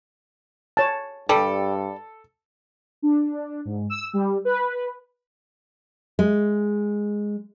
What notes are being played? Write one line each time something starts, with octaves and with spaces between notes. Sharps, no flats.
C#5 A5
G2 G3 A4
D4
G#2
E6
G3
B4
G#3